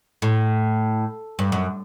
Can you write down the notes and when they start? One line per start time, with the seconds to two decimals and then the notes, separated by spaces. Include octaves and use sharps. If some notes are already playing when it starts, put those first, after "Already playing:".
0.22 A2
1.39 G2
1.52 F#2